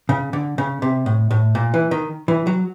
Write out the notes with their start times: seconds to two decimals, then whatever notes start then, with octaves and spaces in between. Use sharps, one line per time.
0.09 C#3
0.33 D3
0.58 C#3
0.82 C3
1.06 A2
1.31 A2
1.55 A#2
1.74 E3
1.91 D#3
2.28 E3
2.47 F#3